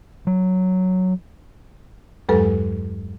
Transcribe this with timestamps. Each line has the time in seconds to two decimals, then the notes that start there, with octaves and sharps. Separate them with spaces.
0.27 F#3
2.29 E2 G2 F#3 G#3 A4 B4